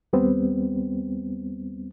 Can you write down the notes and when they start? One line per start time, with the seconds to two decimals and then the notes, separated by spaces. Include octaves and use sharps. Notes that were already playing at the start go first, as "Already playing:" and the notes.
0.13 D#2 G3 B3 C4